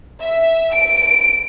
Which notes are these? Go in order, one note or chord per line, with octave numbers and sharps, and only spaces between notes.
E5
D7